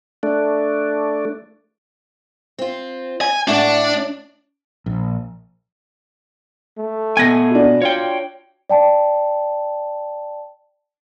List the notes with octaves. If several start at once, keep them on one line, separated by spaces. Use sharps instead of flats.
A3 D4
C4 F4
G#5
A2 A3 D4 F#5
A#1
A3
B2 B3 G#5 G#6 A#6
D4 F#4
F4 C#5 G5
D5 G5 A5